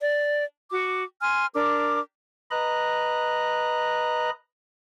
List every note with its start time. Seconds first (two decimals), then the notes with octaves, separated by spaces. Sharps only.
0.01 D5
0.72 F#4 D6
1.22 G#5 C6 F6
1.54 D4 A#4 D6
2.51 B4 D#5 A#5 F#6